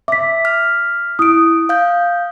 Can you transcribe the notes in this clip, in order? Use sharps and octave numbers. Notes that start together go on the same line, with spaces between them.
E5 D6 B6
F6
E4 D#6 D7
F5 G6